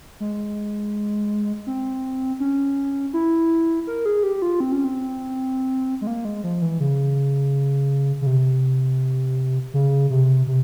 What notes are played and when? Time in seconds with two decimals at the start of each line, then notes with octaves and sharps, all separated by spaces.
0.20 G#3
1.67 C4
2.40 C#4
3.13 E4
3.87 A#4
4.06 G#4
4.23 G4
4.42 F4
4.60 C4
4.72 C#4
4.84 C4
6.01 G#3
6.07 A#3
6.25 G#3
6.44 F3
6.62 E3
6.80 C#3
8.22 C#3
8.27 C3
9.74 C#3
10.10 C3
10.47 C3